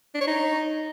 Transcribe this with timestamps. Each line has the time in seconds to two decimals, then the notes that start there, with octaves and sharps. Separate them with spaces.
0.14 D4
0.21 C#5
0.27 D#4